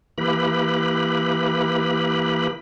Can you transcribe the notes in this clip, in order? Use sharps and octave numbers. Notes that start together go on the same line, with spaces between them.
E3 A#3 E4 G4 B4 B5